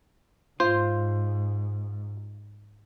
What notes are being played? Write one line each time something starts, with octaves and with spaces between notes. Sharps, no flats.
G#2 F4 C5